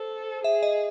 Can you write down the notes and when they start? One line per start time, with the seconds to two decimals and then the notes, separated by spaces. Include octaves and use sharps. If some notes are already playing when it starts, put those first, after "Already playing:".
Already playing: A4 C5
0.44 G#4 E5
0.63 D#5